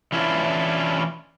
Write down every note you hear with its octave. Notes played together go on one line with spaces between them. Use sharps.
E3 C#4 D4 E4 F4